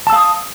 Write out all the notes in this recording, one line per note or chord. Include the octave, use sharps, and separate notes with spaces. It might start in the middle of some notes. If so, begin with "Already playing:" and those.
F5 A5 D#6 E6